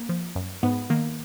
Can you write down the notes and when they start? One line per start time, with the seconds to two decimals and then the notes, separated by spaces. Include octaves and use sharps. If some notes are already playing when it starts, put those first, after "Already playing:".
Already playing: A#3
0.09 F3
0.35 F#2
0.63 G#2 B3
0.90 D#3 A#3